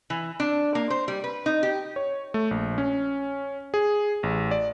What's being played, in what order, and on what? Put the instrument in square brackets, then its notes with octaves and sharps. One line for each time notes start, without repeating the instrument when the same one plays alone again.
[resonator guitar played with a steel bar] E3
D4
A#3
C5
G3
B4
D#4
G4
[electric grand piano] C#5
A3
A#1
C#4
G#4
A1
D5